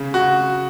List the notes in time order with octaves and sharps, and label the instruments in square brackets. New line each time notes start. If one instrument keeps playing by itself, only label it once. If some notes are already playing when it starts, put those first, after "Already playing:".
Already playing: [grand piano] C#3
F#4